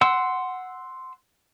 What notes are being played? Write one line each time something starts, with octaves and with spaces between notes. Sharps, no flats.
F#5 C6 E6